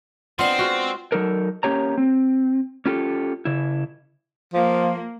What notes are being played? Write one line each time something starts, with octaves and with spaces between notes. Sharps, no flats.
B3 C4 D4 F4 C5 D#5
G#3 F4 F#4
F#3 D#4 A4 A#4
A#3 C#4 G4 C#5 A#5
C4
C#4 F4 G4 A4
C#3 E4
F3 A#3